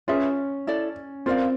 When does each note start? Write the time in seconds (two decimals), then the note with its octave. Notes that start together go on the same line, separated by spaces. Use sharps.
0.08 C#4 F4 G#4 B4 E5
0.67 E4 A4 D5
1.26 C4 F4 A#4 D5 F5